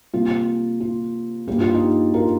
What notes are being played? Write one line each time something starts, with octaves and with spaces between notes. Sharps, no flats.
C3 G3 A#3 F4
F4
G2 G3 A#3 G4
F4
D#4 G4
F4 A#4